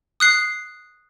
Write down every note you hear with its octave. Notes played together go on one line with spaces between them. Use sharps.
D#6 F#6 C7